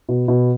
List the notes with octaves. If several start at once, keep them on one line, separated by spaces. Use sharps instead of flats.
B2
B2